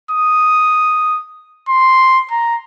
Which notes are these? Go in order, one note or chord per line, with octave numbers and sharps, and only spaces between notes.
D#6
C6
A#5